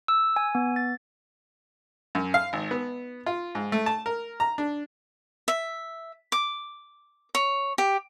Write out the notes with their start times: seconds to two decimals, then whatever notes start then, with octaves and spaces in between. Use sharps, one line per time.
0.08 E6
0.36 G#5
0.55 B3
0.76 A6
2.15 F#2
2.34 F5
2.53 G#1
2.71 B3
3.26 F4
3.55 G#2
3.72 A3
3.86 A5
4.06 A#4
4.40 A#5
4.58 D4
5.48 E5
6.32 D6
7.35 C#5
7.78 G4